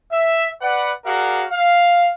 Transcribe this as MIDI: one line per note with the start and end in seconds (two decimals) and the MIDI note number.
0.12 0.48 76
0.61 0.92 71
0.61 0.92 74
0.61 0.92 78
1.06 1.44 66
1.06 1.44 68
1.06 1.44 70
1.06 1.44 74
1.06 1.44 77
1.06 1.44 78
1.51 2.10 77